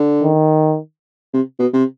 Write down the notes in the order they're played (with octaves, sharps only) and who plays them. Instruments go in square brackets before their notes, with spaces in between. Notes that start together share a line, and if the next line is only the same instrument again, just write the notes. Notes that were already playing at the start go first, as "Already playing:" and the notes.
Already playing: [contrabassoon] D3
[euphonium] D#3
[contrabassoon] C3
B2
C3